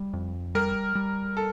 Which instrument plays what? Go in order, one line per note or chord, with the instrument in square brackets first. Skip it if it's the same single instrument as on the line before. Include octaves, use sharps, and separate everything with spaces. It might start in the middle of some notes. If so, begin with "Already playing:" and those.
Already playing: [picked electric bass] G3
F2
[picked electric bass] G3 [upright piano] A#4
[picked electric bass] G3
[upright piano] A4